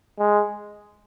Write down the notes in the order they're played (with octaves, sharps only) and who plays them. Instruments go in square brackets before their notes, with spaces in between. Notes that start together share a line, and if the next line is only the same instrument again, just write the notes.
[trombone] G#3